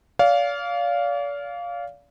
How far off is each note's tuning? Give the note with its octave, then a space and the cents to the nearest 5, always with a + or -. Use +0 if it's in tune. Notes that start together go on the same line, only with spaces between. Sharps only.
D5 -40 F5 +0